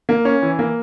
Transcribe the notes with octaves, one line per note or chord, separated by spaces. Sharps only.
A#3
C#4
E3
A#3